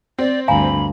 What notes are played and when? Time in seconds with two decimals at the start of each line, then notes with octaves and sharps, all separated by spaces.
0.19 C4 D5
0.48 D2 G2 F5 G#5 A#5 B5